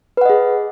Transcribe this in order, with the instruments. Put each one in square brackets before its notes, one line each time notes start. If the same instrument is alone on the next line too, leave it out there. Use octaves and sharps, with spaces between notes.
[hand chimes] B4
F#5
D#5
G#4